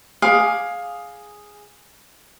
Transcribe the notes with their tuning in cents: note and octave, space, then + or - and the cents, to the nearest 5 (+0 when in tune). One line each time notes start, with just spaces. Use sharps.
G#4 +0 F5 +15 D6 +0